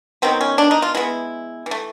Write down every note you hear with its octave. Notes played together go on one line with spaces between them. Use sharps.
D#3 F#3 B3 C4
C#4
D4
D#4
F4
E3 G#3 B3 E4
E3
A3